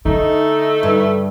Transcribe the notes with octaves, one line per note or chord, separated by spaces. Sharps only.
D3 A3 D#4
G2